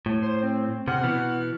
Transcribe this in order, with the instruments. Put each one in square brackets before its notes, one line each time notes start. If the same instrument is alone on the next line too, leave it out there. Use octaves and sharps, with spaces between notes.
[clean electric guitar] A2
[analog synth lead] C5
C4
[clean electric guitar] C3 [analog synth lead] F#5 [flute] F6
[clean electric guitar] B2 E3 B3